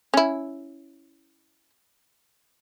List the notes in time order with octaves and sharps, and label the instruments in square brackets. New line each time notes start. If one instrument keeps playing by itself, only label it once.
[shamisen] C#4 E4